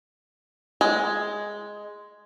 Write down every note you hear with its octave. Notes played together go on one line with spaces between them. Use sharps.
G#3